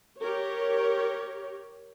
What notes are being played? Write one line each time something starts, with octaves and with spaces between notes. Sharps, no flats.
G4 A#4 C#5